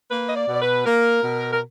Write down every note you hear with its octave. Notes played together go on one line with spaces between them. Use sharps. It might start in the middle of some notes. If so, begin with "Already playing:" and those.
A#3 B4
D#5
D5
B2
D5
B4
A#3 A#4
B2
A#4